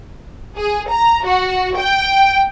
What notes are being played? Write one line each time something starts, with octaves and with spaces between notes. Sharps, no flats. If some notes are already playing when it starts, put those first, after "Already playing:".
G#4
A#5
F#4
G5